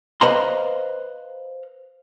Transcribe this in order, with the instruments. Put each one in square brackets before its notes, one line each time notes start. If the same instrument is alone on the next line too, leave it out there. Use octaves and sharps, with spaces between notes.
[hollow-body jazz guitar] B4 C5 D#5 F5 A#5 C6